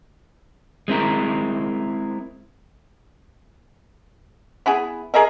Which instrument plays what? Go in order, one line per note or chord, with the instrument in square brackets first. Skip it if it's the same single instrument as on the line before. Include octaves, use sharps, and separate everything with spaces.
[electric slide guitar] G#3 C4 E4 A#4
[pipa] B3 E4 G#4
G#4 A#4 D#5 E5